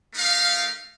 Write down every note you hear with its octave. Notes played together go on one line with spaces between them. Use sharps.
A3 D#4 A#4 F5